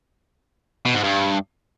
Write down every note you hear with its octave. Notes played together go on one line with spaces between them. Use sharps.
B2
G#2
G2